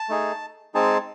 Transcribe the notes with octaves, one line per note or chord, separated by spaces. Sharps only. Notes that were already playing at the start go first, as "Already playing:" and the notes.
Already playing: A5
A3 D#4 G#4
G#3 C4 D#4 G#4 A5